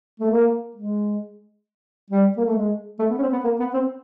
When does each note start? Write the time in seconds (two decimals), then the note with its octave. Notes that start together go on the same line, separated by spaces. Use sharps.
0.20 A3
0.31 A#3
0.75 G#3
2.10 G3
2.37 A#3
2.45 A3
2.55 G#3
2.99 A3
3.10 B3
3.18 C#4
3.22 C4
3.33 B3
3.44 A#3
3.60 B3
3.74 C4